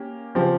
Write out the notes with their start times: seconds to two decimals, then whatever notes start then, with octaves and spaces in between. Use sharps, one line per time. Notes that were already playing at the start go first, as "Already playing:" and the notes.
Already playing: A#3 C#4 G4
0.35 C#3 F3 C4 G4